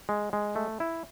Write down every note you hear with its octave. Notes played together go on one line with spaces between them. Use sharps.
G#3
G#3
A3
E4